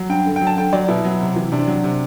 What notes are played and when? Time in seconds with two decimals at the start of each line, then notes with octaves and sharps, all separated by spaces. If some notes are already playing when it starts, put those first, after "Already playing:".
Already playing: F#3
0.09 G2 G5
0.26 D3
0.36 G5
0.41 F#3
0.47 A5
0.57 D3 G5
0.73 F#3 D5
0.88 B2 E4
1.05 F#3
1.21 C3
1.36 E3
1.52 C3 D4
1.67 F#3
1.84 C3